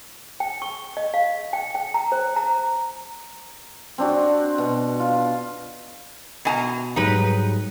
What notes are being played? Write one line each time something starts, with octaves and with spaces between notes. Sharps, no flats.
G5
C#6
D#5
F5
G5
G5
A#5
C5
A#5
C4 D4 F#4
B2
F4
B2 G#5 A#5
G#2 F#3 G3 D#4 B4